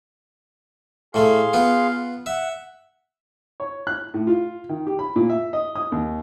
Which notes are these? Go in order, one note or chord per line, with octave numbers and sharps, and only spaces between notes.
A2 A3 G#4 F5 C6
B3 F4
E5 F#5
C#5
F#6
A2
F4
D#3
G4
B5
A#2
E5
D#5
D#6
D#2